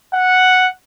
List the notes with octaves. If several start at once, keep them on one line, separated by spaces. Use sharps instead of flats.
F#5